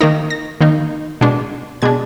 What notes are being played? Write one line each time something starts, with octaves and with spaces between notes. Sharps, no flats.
D#3 A#3 D#4 A#6
A#6
D#3 A#3 D#4
B2 G#3 D4
B2 G#3 D4 G#6